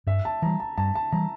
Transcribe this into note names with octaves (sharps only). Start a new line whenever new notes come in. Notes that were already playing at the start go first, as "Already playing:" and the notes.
G2 E5
A5
E3 G3 A#5
A5
G2 A5
A5
E3 G3 A#5